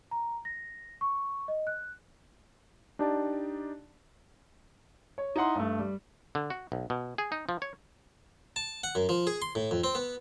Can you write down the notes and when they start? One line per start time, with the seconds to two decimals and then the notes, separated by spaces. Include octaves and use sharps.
0.11 A#5
0.45 A#6
1.01 C#6
1.48 D#5
1.67 F#6
2.99 D4 D#4 G4 D5 A5
5.18 C#5
5.36 D#4 E4 F#5 C6
5.55 G2 A3
5.79 G3
6.35 D3
6.50 F#4
6.72 B1
6.90 B2
7.18 G#4
7.32 D#4
7.49 F3
7.62 C#5
8.56 A5
8.84 F#5
8.95 F#2
9.09 F3
9.27 G#4
9.42 C6
9.55 A2
9.71 F2
9.84 C4
9.95 B3